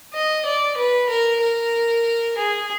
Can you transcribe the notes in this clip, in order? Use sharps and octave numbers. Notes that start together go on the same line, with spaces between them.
D#5
D5
B4
A#4
A#4
G#4